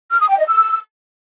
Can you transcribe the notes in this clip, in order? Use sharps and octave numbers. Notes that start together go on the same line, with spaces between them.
F6
D#6
G5
D#5
E6